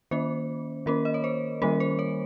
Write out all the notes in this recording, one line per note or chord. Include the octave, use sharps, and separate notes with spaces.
D#3 A#3 C#4 C5
D#3 A#3 C#4 A#4
D#5
C#5
C5
D#3 G3 A#3 C#4 A#4
C5
C#5